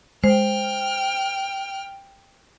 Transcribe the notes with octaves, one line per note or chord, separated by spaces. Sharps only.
G#3 C5 G5 F6